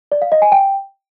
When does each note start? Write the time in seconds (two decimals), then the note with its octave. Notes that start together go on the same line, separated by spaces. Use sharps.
0.12 D5
0.22 F5
0.32 D#5
0.42 G#5
0.52 G5